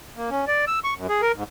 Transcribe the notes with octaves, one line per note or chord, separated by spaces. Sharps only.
A#3
C#4
D5
E6
C#6
F#2
G#4
A#4
G#2